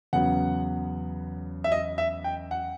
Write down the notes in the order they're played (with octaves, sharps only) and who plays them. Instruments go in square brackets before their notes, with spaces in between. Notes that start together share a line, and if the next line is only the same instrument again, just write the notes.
[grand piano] E2 C#3 F#3 B3 F#5
E5
D#5
E5
G5
F#5